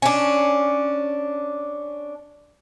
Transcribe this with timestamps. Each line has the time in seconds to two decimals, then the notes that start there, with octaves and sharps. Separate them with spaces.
0.02 C#4 D4